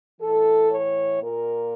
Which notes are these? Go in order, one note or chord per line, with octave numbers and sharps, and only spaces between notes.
A2 E3 A4
C#5
A#2 A#4